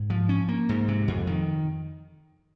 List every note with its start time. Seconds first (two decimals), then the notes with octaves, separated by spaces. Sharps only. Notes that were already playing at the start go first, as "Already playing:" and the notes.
Already playing: G#2
0.10 F3
0.29 C#4
0.48 A#3
0.69 G#2
0.88 C3
1.08 F2
1.27 D#3